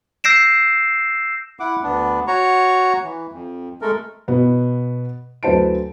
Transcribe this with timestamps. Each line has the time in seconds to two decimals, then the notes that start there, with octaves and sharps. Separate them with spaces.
0.24 E6 G6 A#6 C7 D7 E7
1.60 E4 F#5 D6
1.84 D2 B3 D4
2.27 F#4 C#5 A#5 C#6
3.04 E3
3.32 F2
3.82 G#3 A3 A4 A#4
4.28 B2 B3
5.43 D2 F#3 B4 C5 A5 D7